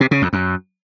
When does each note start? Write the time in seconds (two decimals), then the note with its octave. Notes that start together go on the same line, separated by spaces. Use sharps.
0.01 C3
0.11 C#3
0.22 F2
0.33 F#2